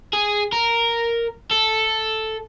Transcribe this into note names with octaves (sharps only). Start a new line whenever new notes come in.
G#4
A#4
A4